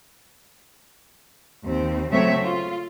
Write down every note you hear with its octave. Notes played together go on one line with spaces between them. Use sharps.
D#2 C4
C#3 F#3 A3 C4 C#5 E5
F4